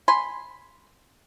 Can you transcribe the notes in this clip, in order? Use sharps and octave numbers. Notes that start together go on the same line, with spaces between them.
G#5 B5 C6